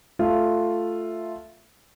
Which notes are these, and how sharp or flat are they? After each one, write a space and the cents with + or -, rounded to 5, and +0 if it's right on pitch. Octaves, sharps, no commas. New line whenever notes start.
A3 +0 F4 +0